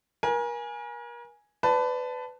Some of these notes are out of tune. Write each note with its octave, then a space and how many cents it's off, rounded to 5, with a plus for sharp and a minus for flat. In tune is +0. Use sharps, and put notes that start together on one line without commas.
A#4 +35 G#5 +0
B4 +25 D5 -10 A5 +5